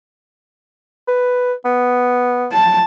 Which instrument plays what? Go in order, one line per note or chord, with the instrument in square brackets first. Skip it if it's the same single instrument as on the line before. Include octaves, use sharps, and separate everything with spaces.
[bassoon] B4
B3
[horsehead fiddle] A5